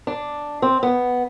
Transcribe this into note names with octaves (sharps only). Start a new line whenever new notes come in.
D4
C4
B3